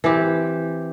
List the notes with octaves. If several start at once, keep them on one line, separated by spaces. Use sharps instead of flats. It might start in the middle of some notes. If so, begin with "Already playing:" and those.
E3 C4 G4